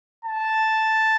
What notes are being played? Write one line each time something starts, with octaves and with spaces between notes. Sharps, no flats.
A5